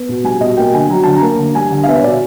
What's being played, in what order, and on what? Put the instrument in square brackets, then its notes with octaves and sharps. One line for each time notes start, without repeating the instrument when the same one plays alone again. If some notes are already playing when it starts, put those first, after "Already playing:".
Already playing: [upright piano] B3
B2
G3 G#5
B2 D#5
A#3 G5
D3 G#5
F#3 A#5
D3 A5
A#5
A#3
D3
G3 G#5
D3
F5
B3 E5
C#5
B2 D5